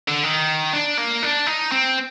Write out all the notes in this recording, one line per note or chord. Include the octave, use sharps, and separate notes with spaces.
D3
D#3
D4
A#3
D4
D#4
C4